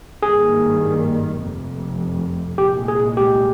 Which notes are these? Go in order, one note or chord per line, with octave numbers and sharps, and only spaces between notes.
G#1 G2 D#3 G3 A#3 G#4
F1 F2 C3
C2 A#2 G#3 G4
G#4
G4